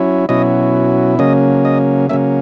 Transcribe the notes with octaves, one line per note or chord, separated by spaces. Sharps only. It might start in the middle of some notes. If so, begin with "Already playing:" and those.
Already playing: F#3 C#4 E4
B2 F#3 C#4 E4 D#5
C#3 F#3 A#3 C#4 D#5
D#5
C#3 F#3 A#3 C#4 E5